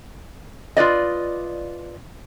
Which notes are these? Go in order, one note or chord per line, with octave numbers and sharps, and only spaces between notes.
F4 B4 D5 D#5